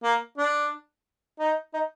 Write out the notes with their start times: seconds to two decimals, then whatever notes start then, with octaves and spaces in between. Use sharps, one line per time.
0.03 A#3
0.38 D4
1.40 D#4
1.74 D#4